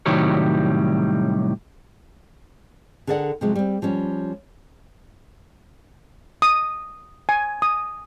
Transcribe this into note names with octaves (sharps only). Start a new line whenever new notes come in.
C2 A2 D#3 F#3 G3 C#5
D3 G#4 A#4 D5 F#5
C3 F3 F#3 G#3
G3 C4
F3 G3 C#4
D#6
G#5
D#6